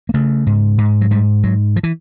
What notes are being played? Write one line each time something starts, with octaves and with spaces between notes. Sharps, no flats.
A#3
C#3 A3
G#2
G#2
F#3
G#2 G3
G#2 F#3
F3
E3